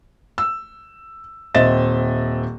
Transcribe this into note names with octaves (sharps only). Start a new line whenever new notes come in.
E6
D#1 C4 D#5 E5 A6 E7